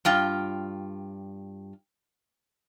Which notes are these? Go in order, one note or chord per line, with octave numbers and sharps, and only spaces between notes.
G2 F4 G5